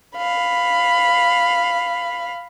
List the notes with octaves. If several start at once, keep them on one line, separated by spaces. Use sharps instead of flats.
F5 B5